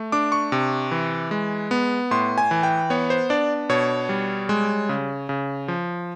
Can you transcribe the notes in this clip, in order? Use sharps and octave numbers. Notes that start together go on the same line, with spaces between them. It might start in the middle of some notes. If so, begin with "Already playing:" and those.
Already playing: A3
D4 D6
C#6
C3
E3
G#3
B3
A2 C6
G#5
E3
G5
B3 C#5
C5
D4 D5
B2 C#5
G3
G#3
C#3
C#3
F3